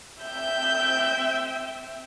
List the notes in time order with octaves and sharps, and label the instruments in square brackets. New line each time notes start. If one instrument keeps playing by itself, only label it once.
[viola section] C4 E5 G5 [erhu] G6